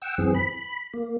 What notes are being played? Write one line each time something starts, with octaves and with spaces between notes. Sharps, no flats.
F#5 G5 E6
F#2 E3 C4 G#4
B5
A#3